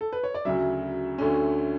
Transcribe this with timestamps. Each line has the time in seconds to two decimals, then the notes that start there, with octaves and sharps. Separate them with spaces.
0.01 A4
0.13 B4
0.24 C#5
0.34 D5
0.45 D2 C#3 F#3 E5
1.18 D2 D3 A3 C#4